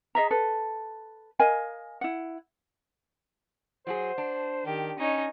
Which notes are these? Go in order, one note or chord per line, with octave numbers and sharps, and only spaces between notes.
G#4 D#5 E5 A#5
A4 B4
A#4 D#5 F5 G#5
E4 F#5
F#3 F#4 G#4 C5
D4
D#3 G4
C#4 D#4 C#5